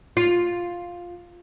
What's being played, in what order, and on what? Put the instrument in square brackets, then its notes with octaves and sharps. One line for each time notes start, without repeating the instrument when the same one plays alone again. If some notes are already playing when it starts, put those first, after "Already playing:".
[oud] F4